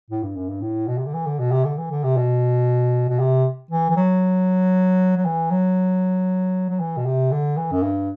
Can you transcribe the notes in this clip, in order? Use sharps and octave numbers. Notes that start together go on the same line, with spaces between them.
A2
G2
F#2
G2
A2
B2
C3
D3
E3
D3
B2
C3
D3
E3
D3
C3
B2
B2
C3
E3
E3
F#3
F#3
E3
F#3
F#3
E3
B2
C3
D3
E3
F#2
G2